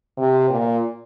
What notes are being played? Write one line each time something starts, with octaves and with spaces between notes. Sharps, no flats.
C3
A#2